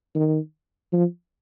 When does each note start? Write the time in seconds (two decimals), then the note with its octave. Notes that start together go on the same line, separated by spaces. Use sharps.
0.15 D#3
0.93 F3